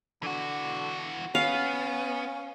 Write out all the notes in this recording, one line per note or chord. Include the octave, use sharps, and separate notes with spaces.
D3 E3 F#4
B3 C#4 F5